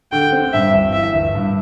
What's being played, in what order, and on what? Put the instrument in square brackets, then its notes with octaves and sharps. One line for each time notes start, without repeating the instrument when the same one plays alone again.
[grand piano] D3 [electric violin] G5
[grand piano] C4
[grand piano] G2 [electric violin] E5
[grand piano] G1
[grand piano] E3 [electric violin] E5
[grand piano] G1
G2